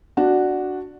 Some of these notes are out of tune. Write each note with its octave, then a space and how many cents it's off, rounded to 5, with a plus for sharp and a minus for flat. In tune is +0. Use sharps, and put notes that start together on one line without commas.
D4 +5 F#4 +0